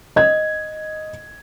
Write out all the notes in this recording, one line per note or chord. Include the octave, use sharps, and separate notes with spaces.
D#5 G#6